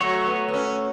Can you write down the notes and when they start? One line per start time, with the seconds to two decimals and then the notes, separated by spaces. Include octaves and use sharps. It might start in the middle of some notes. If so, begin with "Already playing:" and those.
0.01 F#3 A3 F#4 C#5
0.27 B3
0.48 B3
0.54 C#4